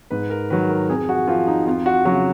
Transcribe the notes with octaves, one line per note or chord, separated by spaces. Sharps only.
G#2 B4
A#4
D#3 F#3 B4
A#4
F2 G#4
F#4
F3 F4
D#4
F2 F4
F#4
C#3 F#3 F#4